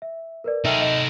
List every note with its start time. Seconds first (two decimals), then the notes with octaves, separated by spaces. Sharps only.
0.02 E5
0.44 A#4 B4 D5
0.65 D#4 A4 E5 G5 F6
0.81 D#5